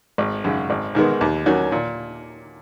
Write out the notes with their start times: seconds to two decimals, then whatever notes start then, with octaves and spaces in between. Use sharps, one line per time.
0.18 G#1
0.44 F#2 C#3
0.70 G#1
0.95 G#2 D#3 G#3 B3
1.21 D#2
1.46 D#3 F#3 C#4 F#4
1.72 A#2